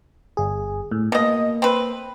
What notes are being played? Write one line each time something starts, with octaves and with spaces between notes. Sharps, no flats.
G1 G#4
A2
B2 A#3 D#5
C4 B4